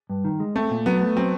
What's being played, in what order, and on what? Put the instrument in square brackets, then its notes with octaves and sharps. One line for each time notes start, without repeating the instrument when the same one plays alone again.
[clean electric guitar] G2
D#3
G#3
[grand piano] A3 [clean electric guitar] C4
[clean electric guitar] A#2
[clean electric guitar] F#3 [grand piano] B3
[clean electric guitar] A3
[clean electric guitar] F#3 [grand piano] C4